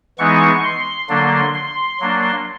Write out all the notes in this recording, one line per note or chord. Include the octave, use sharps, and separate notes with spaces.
E3 G#3 B3 D#4 C#6
C6
D3 F#3 A#3 D4
C6
F#3 A#3 D4